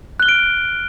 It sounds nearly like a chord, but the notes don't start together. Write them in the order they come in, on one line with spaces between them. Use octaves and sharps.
F#6 G7 F6 D7